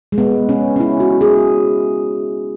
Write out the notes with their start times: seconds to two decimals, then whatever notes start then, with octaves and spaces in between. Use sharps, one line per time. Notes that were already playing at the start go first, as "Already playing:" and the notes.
0.12 G#3
0.18 B3
0.49 C#4
0.76 C#4
0.80 E4
1.00 F#4
1.21 G#4